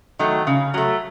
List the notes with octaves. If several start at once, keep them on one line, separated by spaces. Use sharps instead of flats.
D#3 F#3 A3
C#3
F#3 A3